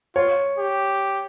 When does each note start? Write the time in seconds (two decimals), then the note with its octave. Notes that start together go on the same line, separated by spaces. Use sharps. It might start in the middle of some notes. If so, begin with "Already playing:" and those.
0.16 F4 C#5
0.58 G4